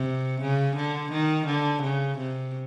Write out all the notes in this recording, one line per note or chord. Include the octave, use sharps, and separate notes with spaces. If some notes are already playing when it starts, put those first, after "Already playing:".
Already playing: C3
C#3
D3
D#3
D3
C#3
C3